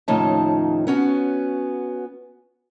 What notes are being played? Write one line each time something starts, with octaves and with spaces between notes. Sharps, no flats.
D#2 A2 C#3 F3 D#4 A5
B3 C#4 F#4